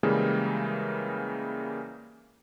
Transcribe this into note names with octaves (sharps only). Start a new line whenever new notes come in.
C#3 E3 G3 G#3 A#3